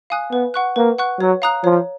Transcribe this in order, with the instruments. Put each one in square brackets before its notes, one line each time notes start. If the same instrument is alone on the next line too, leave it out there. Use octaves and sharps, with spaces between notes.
[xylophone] F5 G#5 D#6 F#6
[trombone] B3 [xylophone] B4
[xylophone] F#5 C#6 F#6
[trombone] A#3 [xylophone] B4
[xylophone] F#5 C#6 F#6
[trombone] F#3 [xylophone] C#5
[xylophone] F5 A#5 D#6 F#6
[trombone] F3 [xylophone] C#5